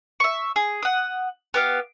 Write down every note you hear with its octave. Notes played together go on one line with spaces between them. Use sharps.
E5 C#6
G#4
F#5 D#6
B3 G4 F5